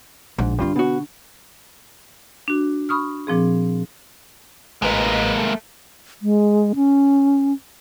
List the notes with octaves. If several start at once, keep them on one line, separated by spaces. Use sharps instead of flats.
A#1 G#2
G2 D3 D4 F4
B2 F#4
D4 F#4
B5 C#6 D#6 F6
A#2 F3 C4 G#4
A1 G#3 A#3 B4 D#5
A3
G#3
C#4